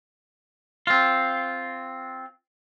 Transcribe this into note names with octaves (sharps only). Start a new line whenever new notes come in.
C4 F4